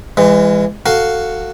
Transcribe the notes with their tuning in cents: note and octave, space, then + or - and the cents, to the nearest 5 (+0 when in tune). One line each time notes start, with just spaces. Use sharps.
E3 +20 G#3 -25
F#4 +0 A4 +20 F5 +0